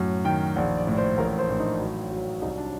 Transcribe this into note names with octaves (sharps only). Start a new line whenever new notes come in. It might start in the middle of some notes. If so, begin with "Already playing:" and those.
Already playing: F#2 A2
D#3 G5
A#1 F#5
D5
A2
C5
A1 A#4
C5
A2 D4
D#4
F#3
F#3
C2 D#4
D4